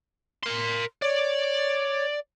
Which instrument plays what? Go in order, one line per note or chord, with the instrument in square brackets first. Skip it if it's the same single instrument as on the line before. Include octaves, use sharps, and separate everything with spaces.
[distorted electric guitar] A#4 C6
[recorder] C#5 [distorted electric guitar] D5